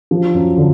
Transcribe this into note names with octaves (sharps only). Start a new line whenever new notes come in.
F3
F#2
D3